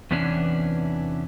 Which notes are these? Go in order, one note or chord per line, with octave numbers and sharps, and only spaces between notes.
E2 C3 E3 B3 C#4 D4